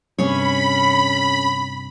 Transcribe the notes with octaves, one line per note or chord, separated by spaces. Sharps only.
G2 C3 C#4 G#4 C#5 B5